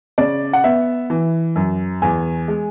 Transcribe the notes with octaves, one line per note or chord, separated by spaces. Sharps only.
C#3 D5
F#5
B3 E5
E3
F#2
E2 G#5
G#3